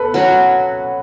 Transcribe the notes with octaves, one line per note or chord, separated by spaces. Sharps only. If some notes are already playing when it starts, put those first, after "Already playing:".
Already playing: A4 B4 A5 B5
F#3 C#4 F#4